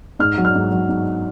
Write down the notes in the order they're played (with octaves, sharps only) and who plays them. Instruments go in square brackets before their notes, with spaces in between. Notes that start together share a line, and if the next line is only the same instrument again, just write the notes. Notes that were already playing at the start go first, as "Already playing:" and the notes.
[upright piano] G#2 F6
F#3
F6
G#2
F#3
G#2